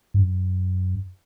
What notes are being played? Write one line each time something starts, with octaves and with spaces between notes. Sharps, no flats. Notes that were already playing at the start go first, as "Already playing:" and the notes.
G2
F#2